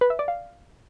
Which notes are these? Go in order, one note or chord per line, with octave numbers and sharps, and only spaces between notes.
B4
E5
D5
F5